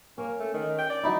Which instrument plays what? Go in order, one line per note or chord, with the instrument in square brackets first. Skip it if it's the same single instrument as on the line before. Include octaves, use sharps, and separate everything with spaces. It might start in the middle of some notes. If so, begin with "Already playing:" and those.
[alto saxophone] A#3 [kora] C#4
[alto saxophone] A3
D#3
G5
D5
[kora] F#3 D#4 E4